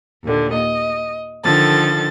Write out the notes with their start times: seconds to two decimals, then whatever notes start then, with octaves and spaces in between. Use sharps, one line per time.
0.24 D#2 A#2 D3
0.54 D#5
1.44 D3 D#3 F3 A4 A6